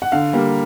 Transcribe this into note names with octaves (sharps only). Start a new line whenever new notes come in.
F#5
D3 F5
G3 A#3